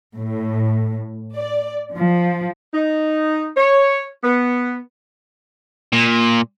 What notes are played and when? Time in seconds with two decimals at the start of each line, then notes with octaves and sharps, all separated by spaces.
0.16 A2
1.37 D5
1.94 F3
2.73 D#4
3.56 C#5
4.23 B3
5.93 A#2